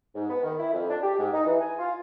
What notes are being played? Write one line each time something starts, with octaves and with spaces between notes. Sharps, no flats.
G#2
B3
D#3
E4
F2
D4
G4
G#2
D#4
E3
G#5
F4